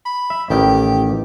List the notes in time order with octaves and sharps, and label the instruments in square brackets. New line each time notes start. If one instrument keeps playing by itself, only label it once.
[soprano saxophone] B5
[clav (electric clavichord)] E5
[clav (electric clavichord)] A1 D#3 [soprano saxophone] G4